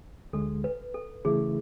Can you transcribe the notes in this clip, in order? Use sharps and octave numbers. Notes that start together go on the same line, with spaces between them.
D2 D3 G#3 A4
B4
A4
C#3 E3 A3 E4 G#4